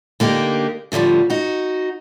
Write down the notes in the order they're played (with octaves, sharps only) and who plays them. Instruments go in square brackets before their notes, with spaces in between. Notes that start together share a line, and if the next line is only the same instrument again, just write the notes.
[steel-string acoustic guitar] D3 A#3 D#4 G4
A2 D3 E3 F3 G3
D#4 F#4